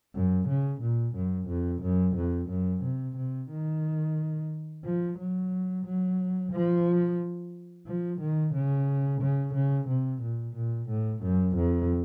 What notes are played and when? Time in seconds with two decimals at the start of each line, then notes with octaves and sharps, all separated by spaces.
0.14 F#2
0.48 C#3
0.81 A#2
1.15 F#2
1.48 F2
1.82 F#2
2.16 F2
2.49 F#2
2.83 C3
3.16 C3
3.50 D#3
4.84 F3
5.18 F#3
5.85 F#3
6.52 F3
7.86 F3
8.20 D#3
8.54 C#3
9.21 C#3
9.54 C#3
9.88 C3
10.22 A#2
10.55 A#2
10.89 A2
11.22 F#2
11.56 F2